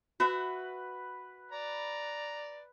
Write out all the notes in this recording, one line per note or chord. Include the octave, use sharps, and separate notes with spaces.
F#4 B4 E5 F#5
D5 A#5